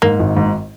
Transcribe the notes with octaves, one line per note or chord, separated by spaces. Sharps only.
G#2 A#3
G#1
G#2